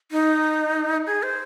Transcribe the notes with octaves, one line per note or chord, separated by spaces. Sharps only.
D#4
G#4
C5